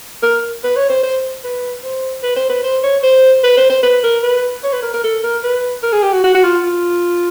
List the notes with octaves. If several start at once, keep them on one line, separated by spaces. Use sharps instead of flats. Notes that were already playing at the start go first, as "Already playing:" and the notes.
A#4
B4
C#5
C5
C5
B4
C5
B4
C5
B4
C5
C#5
C5
B4
C5
C5
B4
A#4
B4
C#5
B4
A#4
A#4
A4
A#4
B4
A#4
G#4
G4
F#4
F#4
F#4
F4
F4